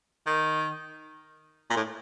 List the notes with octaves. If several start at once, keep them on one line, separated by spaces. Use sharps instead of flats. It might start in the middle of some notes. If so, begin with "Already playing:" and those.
D#3
A#2
A2